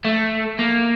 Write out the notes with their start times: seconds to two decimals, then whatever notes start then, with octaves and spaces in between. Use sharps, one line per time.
0.04 A3
0.59 A#3